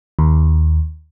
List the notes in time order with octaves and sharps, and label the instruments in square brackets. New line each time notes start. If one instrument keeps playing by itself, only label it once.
[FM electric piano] D#2